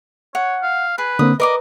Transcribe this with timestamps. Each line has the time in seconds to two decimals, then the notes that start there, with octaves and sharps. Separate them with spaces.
0.35 C#5 F#5
0.62 F5
0.98 G#4 B4
1.19 D3 A#3 C4 D#6
1.40 A#4 B4 D5 D#5 D6